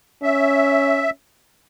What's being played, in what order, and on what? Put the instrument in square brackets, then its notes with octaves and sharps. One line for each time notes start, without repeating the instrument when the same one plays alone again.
[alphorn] C#4 [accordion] E5